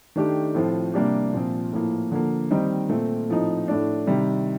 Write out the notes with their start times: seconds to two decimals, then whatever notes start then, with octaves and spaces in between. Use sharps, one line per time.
0.16 D#3 A3 D4 G4
0.55 A2 F3 C4 F4
0.94 C3 G3 A#3 D4 G4
1.33 A#2 F3 C4
1.72 A2 F3 A#3
2.12 D3 F3 A#3
2.50 D#3 G3 C4 D#4
2.89 A#2 A3 C4
3.29 A2 F3 C4 D#4
3.68 A2 A3 D4
4.07 C3 D#3 G3